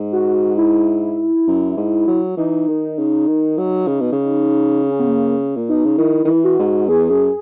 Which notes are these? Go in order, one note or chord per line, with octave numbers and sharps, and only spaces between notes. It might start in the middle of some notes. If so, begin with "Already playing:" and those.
Already playing: G#2
F#4
E4
F#2
G#2
F#3
E3 D#4
D#3
C#3
D#3
F#3
C#3
B2
C#3
C#4
B3
A#3
A#2
B2 D#4
C#3
D#3 E4
D#3
E3
F#4
G#2
E2 G#4
F#2